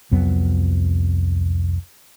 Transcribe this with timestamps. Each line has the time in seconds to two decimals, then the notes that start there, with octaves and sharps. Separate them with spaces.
0.11 C2 F2 F#3 B3